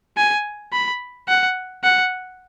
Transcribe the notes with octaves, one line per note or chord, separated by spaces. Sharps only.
G#5
B5
F#5
F#5